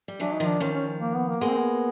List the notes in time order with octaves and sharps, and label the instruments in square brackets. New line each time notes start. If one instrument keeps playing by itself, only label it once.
[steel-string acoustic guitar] G3
[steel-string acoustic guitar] E3 F#3 [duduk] D4
[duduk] D#4
[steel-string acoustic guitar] D#3 F3
[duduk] D4
[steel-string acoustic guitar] D#3 F3 [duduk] C#4
[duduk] C#4
A#3
B3
A#3
[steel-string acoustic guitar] G#3 A#3 [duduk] B3
[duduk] C4
B3